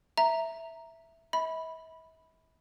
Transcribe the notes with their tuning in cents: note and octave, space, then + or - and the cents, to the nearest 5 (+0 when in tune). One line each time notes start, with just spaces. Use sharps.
E5 +0 A#5 +0
E5 -40 B5 +0